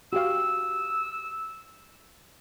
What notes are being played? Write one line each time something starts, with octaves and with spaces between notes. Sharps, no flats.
F#4 G4 F5 E6